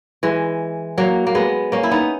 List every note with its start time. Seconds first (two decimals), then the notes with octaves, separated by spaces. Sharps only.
0.23 E3 G#3
0.98 F#3 A#3
1.27 A#3
1.35 G#3 B3
1.72 A#3 C#4
1.83 E4
1.91 B3 D#4